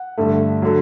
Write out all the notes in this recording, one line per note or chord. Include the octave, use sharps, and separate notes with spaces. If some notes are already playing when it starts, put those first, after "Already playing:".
Already playing: F#5
G2 D3 A3
D3 F#3